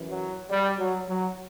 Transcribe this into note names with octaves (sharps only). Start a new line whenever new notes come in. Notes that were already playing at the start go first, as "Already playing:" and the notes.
Already playing: F#2 E3
F#3
G3
F#3
F#3